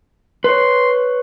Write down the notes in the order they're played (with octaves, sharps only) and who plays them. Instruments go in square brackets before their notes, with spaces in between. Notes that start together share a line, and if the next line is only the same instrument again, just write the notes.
[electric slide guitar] B4 C#5 [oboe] C6